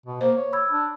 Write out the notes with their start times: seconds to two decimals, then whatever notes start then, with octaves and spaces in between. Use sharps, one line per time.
0.06 B2
0.21 A#3 C5
0.37 C#5
0.53 B5 E6 G#6
0.71 D4